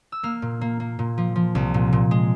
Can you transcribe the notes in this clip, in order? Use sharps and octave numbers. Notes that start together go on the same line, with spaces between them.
E6
A#3 F6
A#2
A#3
A#3
A#2
F3
F3
C2
A#2
A#2
G#3